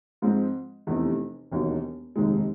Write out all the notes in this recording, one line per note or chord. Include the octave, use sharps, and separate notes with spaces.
G#2 F3 G#3 C4
F1 E2 C3 E3 A3
E1 D#2 D#3 F#3
F1 D#2 D#3 G#3